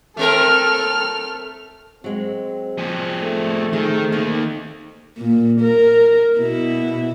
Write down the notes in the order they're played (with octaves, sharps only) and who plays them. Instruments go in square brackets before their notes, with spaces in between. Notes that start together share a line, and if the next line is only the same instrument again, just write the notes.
[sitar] A3 C4 A#4 [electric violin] A4 F6
[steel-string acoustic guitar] F#3 G#3 [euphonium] C4
[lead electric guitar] F3 G#4
[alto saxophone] A3
[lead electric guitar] D#3 [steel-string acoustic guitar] G#4
[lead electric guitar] D#3 A#3 [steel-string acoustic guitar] D#4 D5
[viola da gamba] A#2
A#4
B2 E4